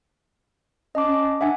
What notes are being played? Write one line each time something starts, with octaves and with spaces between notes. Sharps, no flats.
C#4 D#5 A5 D6
C#4
D4 E5 F#5 G#5